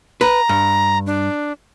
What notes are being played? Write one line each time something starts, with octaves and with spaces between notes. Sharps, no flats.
B4 A#5
G2
D4